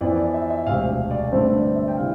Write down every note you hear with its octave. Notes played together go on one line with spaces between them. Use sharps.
F2 E3 B3 D5
D5
E5
E5
E1 D2 C3 F5
D5
G2 D3 A3 C4 C5
D5
E5
G5
C3 E3 F5